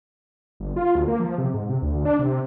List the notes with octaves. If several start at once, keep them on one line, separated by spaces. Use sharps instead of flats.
G1
F4
D2
A#3
F3
C3
G#2
C3
D2
D4
C3